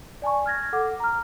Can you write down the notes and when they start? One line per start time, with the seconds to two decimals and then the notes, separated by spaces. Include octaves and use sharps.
0.22 D5 G#5 A5 C#6
0.46 F6 G#6 A#6
0.73 A4 F#5 D6
1.00 A#5 F6